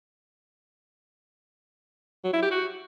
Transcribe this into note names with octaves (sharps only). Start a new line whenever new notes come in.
F#3
E4
G4
F#4